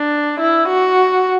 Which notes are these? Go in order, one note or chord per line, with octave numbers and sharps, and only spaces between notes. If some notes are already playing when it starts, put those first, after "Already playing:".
Already playing: D4
E4
F#4